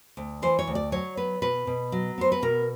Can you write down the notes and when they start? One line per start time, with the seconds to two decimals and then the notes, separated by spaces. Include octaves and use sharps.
0.17 D2
0.42 E3 C5
0.59 C#5
0.67 D2
0.75 D5
0.92 F#3 C#5
1.17 B3 B4
1.42 B2 B4
1.67 B2
1.92 F#3
2.18 B3 C5
2.32 B4
2.42 B2 A#4